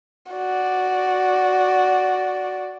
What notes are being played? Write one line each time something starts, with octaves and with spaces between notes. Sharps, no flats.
F#4 D5